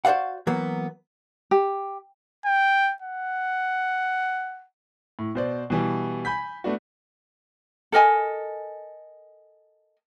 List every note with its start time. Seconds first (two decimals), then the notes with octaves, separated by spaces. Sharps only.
0.05 F#4 C5 D5 F5 F#5
0.47 E3 F#3 A#3 B3
1.51 G4
2.45 G5
3.02 F#5
5.19 A2
5.35 B2 C5 D5
5.70 B2 E3 G3
6.25 G#5 B5 G6 B6
6.64 A3 B3 D4 F#4
7.92 A4 A#4 D#5 G#5